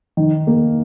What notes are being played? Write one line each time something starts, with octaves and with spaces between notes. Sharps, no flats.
D#3
A#3